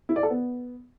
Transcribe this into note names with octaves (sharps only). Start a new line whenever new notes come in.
E4
D5
A4
B3